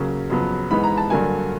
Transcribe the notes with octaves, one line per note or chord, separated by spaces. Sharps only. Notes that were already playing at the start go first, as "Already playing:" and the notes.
Already playing: C#3 F#3 A#3 C#4
F2 C#3 F#3 B3
G#2 E3 G#3 B3 B5
A#5
A5
G2 D3 F#3 A#3 G#5